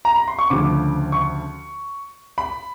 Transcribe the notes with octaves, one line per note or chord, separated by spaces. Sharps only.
A#5
B5
C6
C#6
D2 C#3 F3 D6
C#6
B5